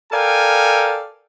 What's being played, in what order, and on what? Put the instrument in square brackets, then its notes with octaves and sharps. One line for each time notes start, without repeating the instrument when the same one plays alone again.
[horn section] A4 A#4 D5 F5 G5 G#5